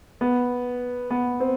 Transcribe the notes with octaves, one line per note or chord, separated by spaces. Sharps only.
B3
B3
C4